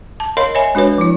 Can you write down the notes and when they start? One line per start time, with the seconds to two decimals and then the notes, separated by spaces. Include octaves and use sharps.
0.20 A5
0.37 A#4 C#5 D#5 F5 B5 C6
0.55 C#5 D#5 E5 G#5 B5
0.75 G#3 D4 F#4 B4 C#5
0.98 F3 E4